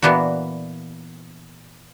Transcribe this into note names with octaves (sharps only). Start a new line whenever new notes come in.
A#2 E3 B3 D4 F#4